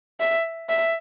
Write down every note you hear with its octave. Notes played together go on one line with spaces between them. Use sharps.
E5
E5